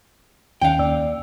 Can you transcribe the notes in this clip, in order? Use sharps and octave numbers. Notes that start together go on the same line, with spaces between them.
D#2 D#3 C#4 F5 G5
D#2 D5 E6